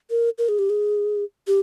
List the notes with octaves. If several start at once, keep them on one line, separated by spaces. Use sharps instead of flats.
A#4
A#4
G#4
G4
G#4
G4